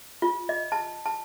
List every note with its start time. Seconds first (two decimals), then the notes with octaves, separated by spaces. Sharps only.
0.22 F4
0.49 D#5
0.72 A5
1.06 A5